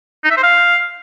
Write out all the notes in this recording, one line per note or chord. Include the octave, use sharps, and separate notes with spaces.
D#4
E5
C5
F5